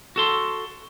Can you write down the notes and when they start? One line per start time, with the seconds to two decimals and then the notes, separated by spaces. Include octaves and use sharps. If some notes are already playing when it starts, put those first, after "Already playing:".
0.16 F#4 A4 C6